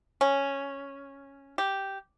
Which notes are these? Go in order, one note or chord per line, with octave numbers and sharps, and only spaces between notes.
C#4
G4